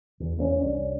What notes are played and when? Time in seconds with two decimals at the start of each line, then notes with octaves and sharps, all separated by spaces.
0.20 E2
0.37 E2 A#3 B3 C#4
0.60 C2 C#4 D4